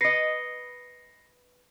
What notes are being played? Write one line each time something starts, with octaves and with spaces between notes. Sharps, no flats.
B4 D#5 A#6 C7 C#7